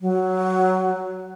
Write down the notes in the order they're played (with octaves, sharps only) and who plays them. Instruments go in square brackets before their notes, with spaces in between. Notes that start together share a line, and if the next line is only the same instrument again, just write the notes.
[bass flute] F#3